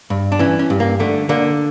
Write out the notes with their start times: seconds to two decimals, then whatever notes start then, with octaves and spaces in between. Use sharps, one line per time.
0.10 G2
0.32 D4
0.39 E3 C#4
0.59 C#4
0.70 G2
0.80 A#3
1.00 D3 A3
1.29 D3 A#3